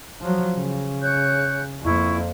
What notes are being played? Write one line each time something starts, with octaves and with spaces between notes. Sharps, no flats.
F3 F#3
C#3
C#5 F#6 G6
F2 A#3 E4 C#6